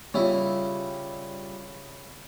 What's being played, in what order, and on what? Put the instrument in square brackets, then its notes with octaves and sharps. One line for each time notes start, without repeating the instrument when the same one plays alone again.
[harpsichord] C#3 E4 [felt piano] G3 F4